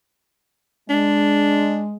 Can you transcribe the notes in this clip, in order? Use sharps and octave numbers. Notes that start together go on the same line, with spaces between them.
G#3 D4